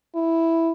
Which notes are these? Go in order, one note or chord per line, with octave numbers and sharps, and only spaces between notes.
E4